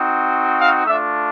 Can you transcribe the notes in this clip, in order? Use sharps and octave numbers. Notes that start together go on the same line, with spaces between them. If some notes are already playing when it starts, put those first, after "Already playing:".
Already playing: C4 D#4 F#4
F5
A3 D4 F4 E5